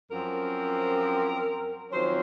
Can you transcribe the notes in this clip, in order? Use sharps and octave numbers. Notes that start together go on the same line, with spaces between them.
F#2 F3 C4 A#4
F2 D#3 F#3 C#4 C5